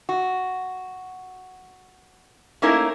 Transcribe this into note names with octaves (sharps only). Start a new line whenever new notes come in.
F#4
A3 A#3 C#4 D#4 E4 A#4